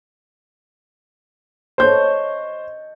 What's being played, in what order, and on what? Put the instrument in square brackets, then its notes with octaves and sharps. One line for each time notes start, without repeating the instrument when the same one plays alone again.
[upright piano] C5 G6 [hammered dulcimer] C#5 D#5 A5